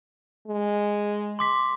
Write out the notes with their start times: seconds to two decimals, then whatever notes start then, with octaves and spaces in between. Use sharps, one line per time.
0.48 G#3
1.39 C6 D6 B6